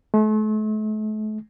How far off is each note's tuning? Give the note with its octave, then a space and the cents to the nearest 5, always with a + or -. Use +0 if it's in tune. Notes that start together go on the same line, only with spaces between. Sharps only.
A3 -40